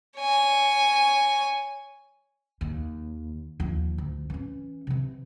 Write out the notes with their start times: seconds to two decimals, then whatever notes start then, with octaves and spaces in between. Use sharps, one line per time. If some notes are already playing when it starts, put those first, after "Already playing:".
0.17 C#5 G#5
2.61 D#2
3.60 D#2 F3
3.98 D2
4.30 E3 C#4
4.87 C3 E3